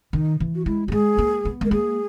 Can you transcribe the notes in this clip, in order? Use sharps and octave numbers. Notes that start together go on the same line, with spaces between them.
D#3 D#4
E3
F#4
G#3 E4
A#3 F#4
G#3 G#4
A#3
B3
G#3 A#4
A#3 G#4